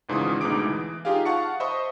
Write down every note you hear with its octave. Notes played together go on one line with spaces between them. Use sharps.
G#1 G#2 C#3 E3 F4 D#6
D2 B2 G#3 D#4 D6 D7
E3
D#4 F4 G4 G#4 F5
F5 F#5 A5 C#6 C#7
C5 D#5 E5 B5 C#6 D#6